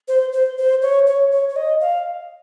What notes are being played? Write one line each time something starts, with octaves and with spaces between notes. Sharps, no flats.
C5
C5
C5
C#5
C#5
C#5
C#5
D#5
F5